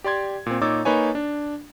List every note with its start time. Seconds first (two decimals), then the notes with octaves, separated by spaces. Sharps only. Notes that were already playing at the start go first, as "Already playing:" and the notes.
0.04 G4 D5 C6 G#6
0.46 A#2 C4
0.61 A#2 D#4 C#5 D6 E6 A6
0.85 A#3 D#4 B4 C#5 G#5
1.15 D4